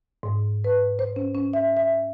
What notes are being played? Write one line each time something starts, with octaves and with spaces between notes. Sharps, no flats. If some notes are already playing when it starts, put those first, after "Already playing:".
G#2
B4
C5
C#4
C#4
E5
E5